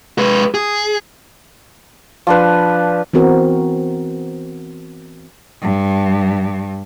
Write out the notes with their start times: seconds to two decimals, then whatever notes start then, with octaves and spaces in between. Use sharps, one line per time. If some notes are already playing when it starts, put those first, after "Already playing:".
0.18 G#3 B4
0.54 G#4
2.27 F3 D4 B4
3.14 E3 B3 C4 F#4 A#4
5.62 G2